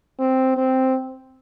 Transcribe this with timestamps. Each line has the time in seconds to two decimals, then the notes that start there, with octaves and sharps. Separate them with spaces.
0.20 C4
0.57 C4